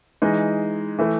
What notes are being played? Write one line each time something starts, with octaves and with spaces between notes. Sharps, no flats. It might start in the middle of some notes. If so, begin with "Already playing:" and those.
E3 G#3 D#4
E3 A3 E4